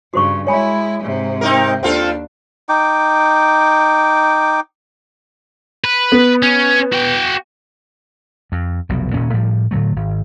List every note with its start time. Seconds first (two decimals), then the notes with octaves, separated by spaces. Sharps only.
0.13 G2 C#3 F#4 C5 C#6
0.47 G#3 E4 C#5 G#5 B5
1.03 G#2 C3
1.41 C4 D#4 A#4
1.83 D#2 C4 D4 F4 A4
2.69 D#4 G5 D6
5.84 B4
6.12 B3
6.43 C#4
6.92 F#4 G5
8.52 F2
8.89 F1 B1 B2
9.14 D#1 A#2 C#4
9.33 A2 F3 G3
9.71 A2 D3 F#3 A3
9.96 G#1